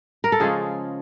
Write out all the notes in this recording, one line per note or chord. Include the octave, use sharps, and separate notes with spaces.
A#4
A4
C#3 F3 G#3 C#4 G#4